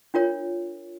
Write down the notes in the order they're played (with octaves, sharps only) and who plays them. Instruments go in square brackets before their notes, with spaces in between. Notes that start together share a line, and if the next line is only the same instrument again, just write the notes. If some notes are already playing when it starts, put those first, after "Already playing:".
[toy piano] D4 F4 A#4 C#5